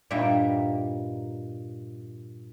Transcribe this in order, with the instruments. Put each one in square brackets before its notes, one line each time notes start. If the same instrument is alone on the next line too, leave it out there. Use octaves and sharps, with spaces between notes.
[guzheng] G2 A#2 G3 D#4 E5 G5